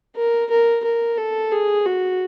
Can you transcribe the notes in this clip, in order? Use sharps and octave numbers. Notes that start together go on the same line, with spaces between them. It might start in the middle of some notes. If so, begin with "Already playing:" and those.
A#4
A#4
A#4
A4
G#4
F#4